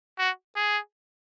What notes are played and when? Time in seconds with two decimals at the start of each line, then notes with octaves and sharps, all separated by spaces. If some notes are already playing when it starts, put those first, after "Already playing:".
0.19 F#4
0.56 G#4